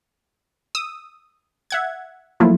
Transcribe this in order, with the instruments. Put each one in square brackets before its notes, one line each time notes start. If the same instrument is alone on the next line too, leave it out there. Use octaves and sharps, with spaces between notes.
[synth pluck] D#6 E6
E5 F#5 G#6
F3 F#3 A3 A#3 E4 F4